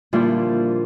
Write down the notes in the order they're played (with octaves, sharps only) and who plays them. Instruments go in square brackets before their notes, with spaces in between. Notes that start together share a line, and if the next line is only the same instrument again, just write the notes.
[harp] A#2 D3 E3 F3 G3 F4